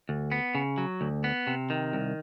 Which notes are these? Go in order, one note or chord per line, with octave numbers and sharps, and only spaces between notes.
D2
B3
C#3
F#3
D2
B3
C3
D#3
C2